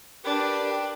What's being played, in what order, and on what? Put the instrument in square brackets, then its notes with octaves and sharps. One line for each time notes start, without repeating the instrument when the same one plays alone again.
[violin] D4 [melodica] G4 B4 [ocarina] A#4